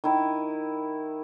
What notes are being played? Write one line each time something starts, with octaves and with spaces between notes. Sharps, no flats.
D#3 E4